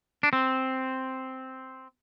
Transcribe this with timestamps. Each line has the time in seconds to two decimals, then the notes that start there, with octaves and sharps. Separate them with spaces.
0.23 D4
0.33 C4